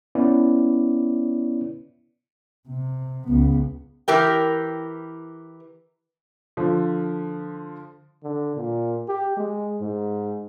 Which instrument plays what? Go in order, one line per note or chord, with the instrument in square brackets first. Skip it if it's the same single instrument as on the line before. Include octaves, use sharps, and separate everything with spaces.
[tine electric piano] B3 C#4 E4 D5
[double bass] C3
C#2 B3
[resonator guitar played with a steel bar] E3 G4 A#4 G5
[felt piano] D3 F3
[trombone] D3
A#2
G4
G#3
G#2